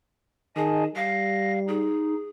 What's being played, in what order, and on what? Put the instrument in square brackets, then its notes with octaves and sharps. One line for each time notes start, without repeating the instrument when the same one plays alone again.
[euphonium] D#3 [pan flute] G#4 [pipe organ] D#5 G#5 A5
[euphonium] G3 [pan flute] F5 [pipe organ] A#6
[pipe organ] D#4 [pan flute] G#4